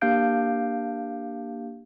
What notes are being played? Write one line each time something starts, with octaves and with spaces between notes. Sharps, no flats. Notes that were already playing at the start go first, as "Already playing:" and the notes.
A#3 D4 G4 F5 G6 D7